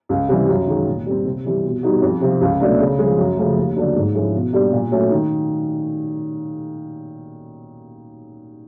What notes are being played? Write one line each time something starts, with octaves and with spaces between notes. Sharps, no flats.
C#2
C3 E3 G3
F#2
D#3 G#3
A#2
G3 C4
C3
E3 G3 C4
B2
G3 B3 D#4 F#4
F2
C3 F3
C#2
B2 F#3 A3 D4
C#3
F3 G#3
F#2
C#3 F3 A3
D#2
D3 F#3 A#3 D4
G#2
F3 G#3 C#4 E4
B2
G3 A#3 D4 G4
A#2
F#3 A3 C#4
D#3